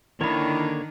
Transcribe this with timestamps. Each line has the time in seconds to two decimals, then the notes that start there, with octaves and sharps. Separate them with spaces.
0.21 D3 D#3 A#3 D4 E4 C#5 B5